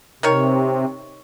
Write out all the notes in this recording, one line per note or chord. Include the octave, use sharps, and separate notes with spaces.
C3 D#3 A#4 C#5